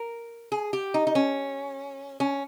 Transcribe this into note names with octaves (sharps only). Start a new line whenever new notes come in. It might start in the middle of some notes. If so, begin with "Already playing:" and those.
Already playing: A#4
G#4
G4
D#4
D#4
C#4
C#4